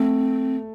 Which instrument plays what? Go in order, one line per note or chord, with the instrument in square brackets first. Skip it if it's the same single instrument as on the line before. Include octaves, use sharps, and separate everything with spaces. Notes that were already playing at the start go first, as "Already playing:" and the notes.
Already playing: [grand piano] A3 [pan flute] C4